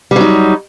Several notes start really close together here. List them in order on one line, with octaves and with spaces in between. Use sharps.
G3 F#3 D#4